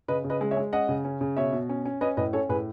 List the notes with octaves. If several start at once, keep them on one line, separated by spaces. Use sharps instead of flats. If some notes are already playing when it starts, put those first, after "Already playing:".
C#3 B4 D#5
C#3
B4 D#5
G#3
C#5 E5
G#3
C#4 D#5 F#5
C#3
C#4
C#3
B2 C#5 E5
B2
C#4
C#4
C#4 B4 D#5
A2 B4 D#5
C#4 A4 C#5
A2 G#4 B4